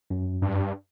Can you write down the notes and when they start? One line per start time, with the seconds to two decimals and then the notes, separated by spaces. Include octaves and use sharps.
0.10 F#2
0.42 G2